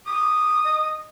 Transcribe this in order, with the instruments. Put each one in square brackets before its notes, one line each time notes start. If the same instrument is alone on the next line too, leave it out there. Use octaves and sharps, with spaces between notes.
[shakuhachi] D6 [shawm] D#6
[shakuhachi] D#5